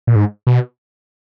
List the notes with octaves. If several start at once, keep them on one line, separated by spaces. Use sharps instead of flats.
A#2
G#2
B2